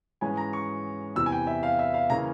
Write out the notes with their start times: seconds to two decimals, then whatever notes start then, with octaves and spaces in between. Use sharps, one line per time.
0.21 G#2 E3 G#3 C#4 G#5
0.37 A#5
0.53 C#6
1.15 E2 C3 E3 E6
1.26 G#5
1.32 G5
1.47 E5
1.63 F5
1.79 E5
1.94 F5
2.10 C#3 E3 A#3 C#4 A#5